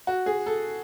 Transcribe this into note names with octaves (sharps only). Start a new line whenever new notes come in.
F#4
G#4
A4